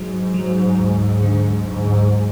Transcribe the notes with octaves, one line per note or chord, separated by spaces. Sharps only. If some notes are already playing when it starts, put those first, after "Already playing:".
Already playing: G#2 F#3
F#3
D2
D3
D2 G#2